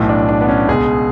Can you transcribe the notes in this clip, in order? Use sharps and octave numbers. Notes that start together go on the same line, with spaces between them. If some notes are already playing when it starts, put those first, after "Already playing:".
Already playing: B1 A2 E3
D4
D4
B3
C#4
C#2 B2 G#4